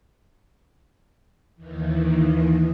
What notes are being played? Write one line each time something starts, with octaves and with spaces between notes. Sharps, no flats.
D#2 D#3 E3